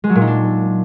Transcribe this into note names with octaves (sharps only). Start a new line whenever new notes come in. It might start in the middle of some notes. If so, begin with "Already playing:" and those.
G#3
F#3
A#2
D#4
D4